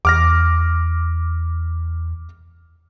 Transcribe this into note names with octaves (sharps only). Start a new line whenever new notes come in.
E2 D6 F6 A#6